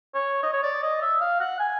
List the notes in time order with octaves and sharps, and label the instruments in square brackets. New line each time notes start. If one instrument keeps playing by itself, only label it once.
[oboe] C#5
D#5
C#5
D5
D#5
E5
F5
F#5
G#5